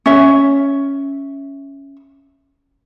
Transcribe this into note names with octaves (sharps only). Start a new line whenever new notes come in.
C#4 E5